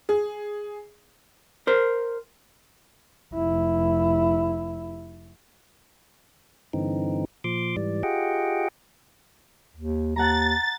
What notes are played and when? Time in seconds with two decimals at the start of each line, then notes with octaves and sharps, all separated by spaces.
0.09 G#4
1.67 A#4 C5
3.33 F1 E4
6.73 G2 D3 E3 C4 D#4
7.44 A#2 F3 C6 D6
7.77 G#2 E3 G3 D5
8.03 F4 G4 G#4 D#5 F#5 G5
9.76 D#2
10.16 D#2 F#5 A5 A#5 A6